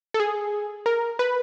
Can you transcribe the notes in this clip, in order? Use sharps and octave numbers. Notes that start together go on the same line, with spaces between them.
A4
G#4
A#4
B4